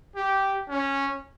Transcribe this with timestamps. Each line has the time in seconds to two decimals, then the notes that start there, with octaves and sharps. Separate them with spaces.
0.16 G4
0.69 C#4